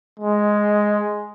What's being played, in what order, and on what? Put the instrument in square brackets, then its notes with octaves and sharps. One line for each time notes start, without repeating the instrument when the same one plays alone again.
[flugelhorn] G#3